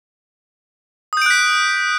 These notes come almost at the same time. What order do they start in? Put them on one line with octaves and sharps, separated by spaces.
D#6 G6 D7 F#6 B6